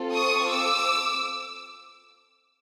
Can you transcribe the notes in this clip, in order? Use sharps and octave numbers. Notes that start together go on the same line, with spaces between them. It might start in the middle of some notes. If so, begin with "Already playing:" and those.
Already playing: C4 F4 A4
C#6 D#6
D6 E6